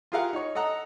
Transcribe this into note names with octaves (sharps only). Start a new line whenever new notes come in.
F4 G4 G#4 A#4 F5 F#5
D#4 C#5
A4 D#5 F#5 A#5